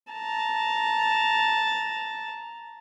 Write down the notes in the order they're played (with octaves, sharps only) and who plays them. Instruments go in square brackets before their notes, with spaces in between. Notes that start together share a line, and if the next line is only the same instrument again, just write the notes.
[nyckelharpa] A5 A#5